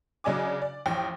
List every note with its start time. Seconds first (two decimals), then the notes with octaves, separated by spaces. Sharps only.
0.24 C#3 F#3 D4 D#5 G#5 D6
0.62 D5
0.86 A1 F2 G5